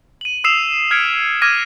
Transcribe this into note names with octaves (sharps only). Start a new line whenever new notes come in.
D#7 F#7
D#6 E6 C7 E7 F7
F6 G#6 B6 C#7 D7
D6 F6 G#6 A#6 D#7